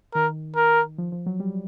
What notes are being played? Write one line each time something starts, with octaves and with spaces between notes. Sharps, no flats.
D#3 A#4
A#4
F3
F3
F#3
G3